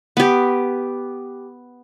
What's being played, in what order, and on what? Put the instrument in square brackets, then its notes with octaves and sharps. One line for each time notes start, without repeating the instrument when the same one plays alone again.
[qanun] B3 G4